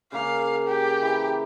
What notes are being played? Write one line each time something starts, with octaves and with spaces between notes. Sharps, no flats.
C#3 A#3 F5 D6
G4
E3